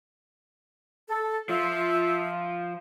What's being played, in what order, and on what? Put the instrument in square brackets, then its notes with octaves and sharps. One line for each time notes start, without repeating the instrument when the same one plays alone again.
[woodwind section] A4
[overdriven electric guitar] F3 [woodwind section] F4 E5